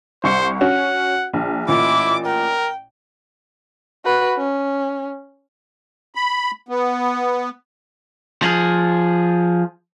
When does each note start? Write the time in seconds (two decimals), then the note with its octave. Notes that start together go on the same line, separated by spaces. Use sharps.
0.24 C2 C5 C#6 C#7
0.61 C#4 F#4 F#5
1.33 A#1
1.68 A1 A#2 E4 D6
2.26 A#4 G5
4.05 F#4 B4
4.38 C#4
6.15 B5
6.69 B3
8.42 F3 G#4